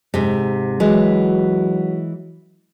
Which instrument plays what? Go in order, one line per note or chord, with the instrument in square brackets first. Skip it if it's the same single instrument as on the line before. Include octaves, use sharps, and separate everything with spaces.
[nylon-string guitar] G#2 C3
[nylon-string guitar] E3 G#3 [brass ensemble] F#3